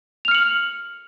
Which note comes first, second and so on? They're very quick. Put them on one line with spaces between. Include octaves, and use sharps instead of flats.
F7 F6 C#7 F#7